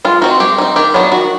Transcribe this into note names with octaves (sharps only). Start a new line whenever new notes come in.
G#3 F4
C4 D#4 F#4
G#3 G4
C4 D#4
D#3 G4
F#3 B3 D4
D#3 F#4